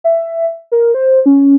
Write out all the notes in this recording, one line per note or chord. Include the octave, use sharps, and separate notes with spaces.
E5
A#4
C5
C#4